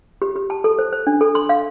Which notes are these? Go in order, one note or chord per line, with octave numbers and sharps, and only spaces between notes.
G4
G4
A5
A4
C5
C5
D4
A4
C6
F5